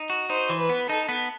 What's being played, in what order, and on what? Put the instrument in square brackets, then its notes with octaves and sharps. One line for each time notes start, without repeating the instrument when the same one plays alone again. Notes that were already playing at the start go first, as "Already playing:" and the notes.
Already playing: [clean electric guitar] D#4
F#4
[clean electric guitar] D#4 [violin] C5
[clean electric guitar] E3
[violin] B4
[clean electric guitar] B3
[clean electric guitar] D#4 [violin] A4
[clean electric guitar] B3